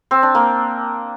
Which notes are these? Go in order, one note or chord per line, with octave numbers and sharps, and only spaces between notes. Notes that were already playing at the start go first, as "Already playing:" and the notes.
C4
D4
A#3